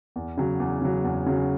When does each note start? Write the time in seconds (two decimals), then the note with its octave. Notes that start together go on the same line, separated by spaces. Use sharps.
0.16 E2
0.38 C#3 F#3
0.60 E2
0.82 C#3 F#3
1.04 E2
1.26 C#3 F#3